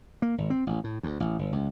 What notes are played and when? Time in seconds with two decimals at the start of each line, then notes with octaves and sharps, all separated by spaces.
0.22 A#3
0.38 G#1
0.50 C4
0.67 A1
0.84 A2
1.03 D2
1.20 A1
1.39 G1
1.52 C#2